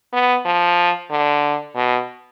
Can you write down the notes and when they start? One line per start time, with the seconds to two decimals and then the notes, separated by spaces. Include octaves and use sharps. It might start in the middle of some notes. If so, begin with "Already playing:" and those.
0.13 B3
0.45 F3
1.11 D3
1.75 B2